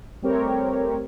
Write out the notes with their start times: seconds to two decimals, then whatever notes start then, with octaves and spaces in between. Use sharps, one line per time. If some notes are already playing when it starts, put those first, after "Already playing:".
0.22 G3 A3 C4 G4 A#4 C#5